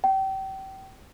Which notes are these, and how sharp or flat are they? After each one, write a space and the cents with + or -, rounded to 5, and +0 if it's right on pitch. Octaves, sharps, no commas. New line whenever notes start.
G5 -30